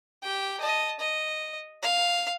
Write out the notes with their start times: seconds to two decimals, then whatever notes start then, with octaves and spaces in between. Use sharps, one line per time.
0.23 G4 G5
0.60 D#5 A5
1.00 D#5
1.82 F5